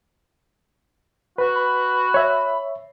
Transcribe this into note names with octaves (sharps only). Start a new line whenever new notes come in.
F#4 B4
B5
C#5 E5